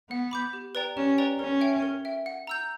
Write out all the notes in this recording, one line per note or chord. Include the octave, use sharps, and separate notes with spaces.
B3 F#5
B5 D6 G6
G4
B4 D5 G5 A#5
C#4 G4
B4 D5 G5 A#5
C#4 A#4
E5 G5
A#4
E5 G5
F#5
A#5 E6 G6